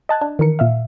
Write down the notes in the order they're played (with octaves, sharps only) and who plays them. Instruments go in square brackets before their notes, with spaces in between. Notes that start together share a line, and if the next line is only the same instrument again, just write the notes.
[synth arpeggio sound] D#5 A5 F#6 G#6
D4
D#3 E3 A#4 C#7
A#2 E5 F5